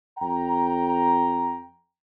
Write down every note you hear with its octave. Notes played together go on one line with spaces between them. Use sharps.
F2 G5 A#5